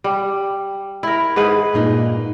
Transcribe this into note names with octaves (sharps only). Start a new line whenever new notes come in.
G3
E4 A#4
G#2 G#4 B4
G2 A#2 D#4